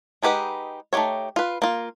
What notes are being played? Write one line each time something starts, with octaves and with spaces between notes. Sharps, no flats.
G#3 D#4 G4 B4 F#5
A3 D#4 F4 G4 C#5
F4 B4
A#3 F4